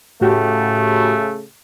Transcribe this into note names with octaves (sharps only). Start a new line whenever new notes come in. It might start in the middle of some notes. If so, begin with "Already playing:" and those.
A2 C#3 A3 F#4 G4